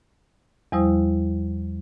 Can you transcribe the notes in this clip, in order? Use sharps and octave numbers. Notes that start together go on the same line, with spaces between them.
E2 F3 G3 E4 C5 D#6